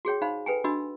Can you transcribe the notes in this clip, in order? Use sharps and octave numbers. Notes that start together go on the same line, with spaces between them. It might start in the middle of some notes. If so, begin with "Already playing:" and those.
F#4 G#4 C#5 G5
D#4 C5 F5 B5
A4 B4 G5 G#5
D4 F#4 D#5 B5 E6